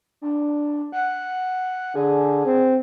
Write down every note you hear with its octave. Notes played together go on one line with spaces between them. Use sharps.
D4
F#5
D3 G#4
C4